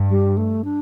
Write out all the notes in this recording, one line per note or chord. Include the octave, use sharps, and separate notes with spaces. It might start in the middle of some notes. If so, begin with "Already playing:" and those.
Already playing: G2
G3
A3
D4